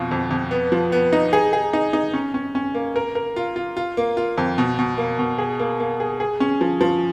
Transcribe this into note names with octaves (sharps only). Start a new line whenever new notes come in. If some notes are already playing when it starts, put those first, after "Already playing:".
Already playing: F2 B2 F4
F2
F2
B3
F3
B3
D#4
G#4
G#4
D#4
D#4
C#4
C#4
C#4
A#3
A#4
A#4
F4
F4
F4
A#3
F4
F2
B2
B2
A#3
B2
G#4
A#3
A#3
G#4
G#4
C#4
F3
F3